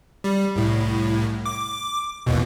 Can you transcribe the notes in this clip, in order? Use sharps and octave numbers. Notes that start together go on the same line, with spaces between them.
G3
C2 A2
D6
A1 D#2 B2